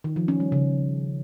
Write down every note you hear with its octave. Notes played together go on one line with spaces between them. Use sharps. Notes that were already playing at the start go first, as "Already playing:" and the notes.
D#3
F3
C#4
G3
C#3